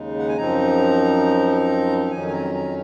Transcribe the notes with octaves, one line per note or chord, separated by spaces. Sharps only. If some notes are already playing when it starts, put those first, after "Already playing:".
Already playing: D#2 C#3 G#3 D#4
F#5
G#5
F#2 F3 C4 D#4 A#5
F2 D#3 F#3 C#4 G#5
G#5
A#5
A#5